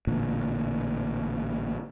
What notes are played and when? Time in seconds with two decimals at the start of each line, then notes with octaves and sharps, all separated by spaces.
0.07 A1 A#2 D3